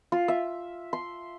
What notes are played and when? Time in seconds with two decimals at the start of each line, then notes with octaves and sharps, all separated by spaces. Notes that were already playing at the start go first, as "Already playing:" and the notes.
0.12 F4
0.28 E5
0.93 C6